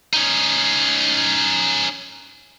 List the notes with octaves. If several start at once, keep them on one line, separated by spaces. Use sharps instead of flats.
C#4 D#4